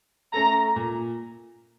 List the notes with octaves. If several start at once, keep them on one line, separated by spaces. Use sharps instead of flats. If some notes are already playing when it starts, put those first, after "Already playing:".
A3 C#4 A4 A#5
A#2